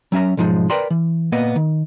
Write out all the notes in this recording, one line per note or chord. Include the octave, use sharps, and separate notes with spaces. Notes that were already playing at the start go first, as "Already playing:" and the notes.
F#3 C#4 E5 A#5
B1 G#2 F3 G#3 D#4
A#4 B4 D5 G5 A#5 C6
E3
A#2 A#3 B3 D#5
D#3